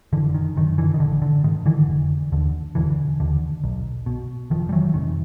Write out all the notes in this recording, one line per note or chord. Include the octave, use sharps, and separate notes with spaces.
F#1 D3 E3
D#3
F#2 D3 D#3
D3 E3
D#3
A1 D3
D3
G#2 D#3
D3 E3
F1
D#2 D3
E1 D3 E3
D#2 D3
B1
B2
F1 D#3 F3
G3
E3 F#3
F2 C3 D#3